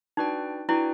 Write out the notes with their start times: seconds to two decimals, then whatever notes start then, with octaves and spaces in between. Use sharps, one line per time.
0.17 D4 D#4 F#4 B4 D5 G5
0.69 D4 E4 F#4 B4 D5 G5